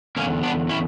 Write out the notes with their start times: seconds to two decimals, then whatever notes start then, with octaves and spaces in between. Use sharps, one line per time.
0.16 E2 D3 A#3 C#4
0.43 B3 D4
0.69 C#4 E4